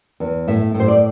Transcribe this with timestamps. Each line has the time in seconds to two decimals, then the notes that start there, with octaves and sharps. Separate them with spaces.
0.20 E2
0.48 A2 E5
0.74 A2
0.80 C5
0.88 D5